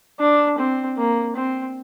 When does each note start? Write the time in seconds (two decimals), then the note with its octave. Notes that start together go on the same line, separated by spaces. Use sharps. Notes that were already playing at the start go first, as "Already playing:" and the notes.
0.20 D4
0.59 C4
0.98 A#3
1.36 C4